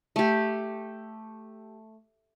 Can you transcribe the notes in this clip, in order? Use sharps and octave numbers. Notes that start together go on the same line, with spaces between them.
A3 G4